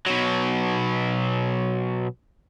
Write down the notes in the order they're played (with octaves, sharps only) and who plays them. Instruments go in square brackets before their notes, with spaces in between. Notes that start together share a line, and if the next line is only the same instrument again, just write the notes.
[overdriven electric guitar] B2 F#3